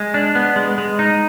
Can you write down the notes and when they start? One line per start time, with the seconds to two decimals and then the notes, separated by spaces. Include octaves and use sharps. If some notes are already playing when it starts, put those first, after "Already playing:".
Already playing: G#3
0.14 D4
0.35 B3
0.56 G#3
0.78 G#3
0.99 D#4